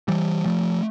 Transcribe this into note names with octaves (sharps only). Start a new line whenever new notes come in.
E3 G3
F3 A3